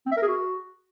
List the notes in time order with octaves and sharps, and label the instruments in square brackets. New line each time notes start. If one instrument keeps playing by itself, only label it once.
[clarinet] C4
E5
A#4
G#4
F#4